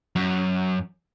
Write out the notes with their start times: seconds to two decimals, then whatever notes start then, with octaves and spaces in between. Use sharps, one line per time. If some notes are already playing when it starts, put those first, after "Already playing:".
0.16 F#2